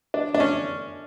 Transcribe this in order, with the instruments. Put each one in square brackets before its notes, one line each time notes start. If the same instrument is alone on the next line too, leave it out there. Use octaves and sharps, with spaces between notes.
[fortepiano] D4
D4
C#4